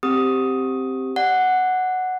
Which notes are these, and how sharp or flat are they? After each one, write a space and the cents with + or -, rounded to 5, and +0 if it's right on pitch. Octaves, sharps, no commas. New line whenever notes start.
C4 +0 G4 +0 D#6 +10
D5 +0 F#5 +0